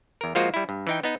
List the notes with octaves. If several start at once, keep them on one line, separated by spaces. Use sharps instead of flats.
E2 A#4
F3 G#3 A#3 F4 F#4 C5
G3 E4
G2
E3 D#4 G5
B3 D#4